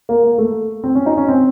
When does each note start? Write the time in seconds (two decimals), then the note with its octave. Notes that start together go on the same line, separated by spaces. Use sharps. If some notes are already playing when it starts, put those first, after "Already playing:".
0.09 A#3
0.24 A#3
0.38 A3
0.84 C4
0.95 C#4
1.06 D#4
1.17 C#4
1.28 C4